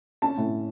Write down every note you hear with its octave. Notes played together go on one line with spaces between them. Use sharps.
C#4 A5
A2